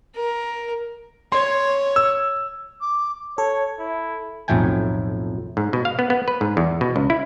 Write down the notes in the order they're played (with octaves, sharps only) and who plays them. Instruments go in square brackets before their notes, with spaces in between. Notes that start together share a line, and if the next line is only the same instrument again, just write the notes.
[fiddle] A#4
[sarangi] C#5 [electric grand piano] C6
[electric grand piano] E6
[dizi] D6
[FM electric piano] A4 [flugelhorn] C#5
[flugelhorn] E4
[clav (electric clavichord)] B1 F2 A2 A3 G5 G#5
G#2
B2
F5
B3
B3
B4
G#2
E2
B2
C#2
E4